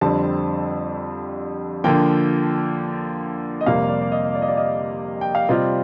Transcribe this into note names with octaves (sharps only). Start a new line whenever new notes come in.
F2 D3 G3 C4 A5
D3 F3 A#3 G5
D#5
F2 C3 G3 A#3 F5
D5
D5
D#5
D5
D#5
D5
D#5
G5
F5
C3 G3 C4 F4 D#5